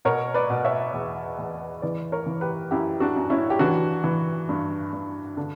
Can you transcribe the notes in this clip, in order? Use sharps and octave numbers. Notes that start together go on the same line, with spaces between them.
B2 A#4 C#5
B4 D5
B2
C#5 E5
E2
E2
E3 B4 D5
A#4 C#5
E3
G4 B4
F#2 E4 G4
D4 F#4
F#2
C#4 E4
G4
E3 D4 F#4
E3
G2
G2
D3 D4